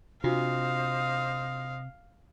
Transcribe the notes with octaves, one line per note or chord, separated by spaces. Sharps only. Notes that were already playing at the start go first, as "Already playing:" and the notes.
C3 D4 F4 F#4 C5 D#5 F5 D#6